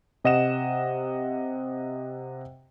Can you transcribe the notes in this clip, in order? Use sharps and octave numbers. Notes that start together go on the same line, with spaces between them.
C3 D#5 F#5 E7